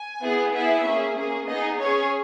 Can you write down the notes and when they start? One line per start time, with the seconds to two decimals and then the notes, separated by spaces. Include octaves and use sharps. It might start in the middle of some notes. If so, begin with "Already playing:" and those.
Already playing: G#5
0.22 B3 E4 G#4
0.53 B3 E4 G#4 E5
0.85 A#3 C#4 G#4
1.17 A#3 C#4 G#4
1.47 B3 D#4 G#4 D#5
1.79 C#4 G#4 C#5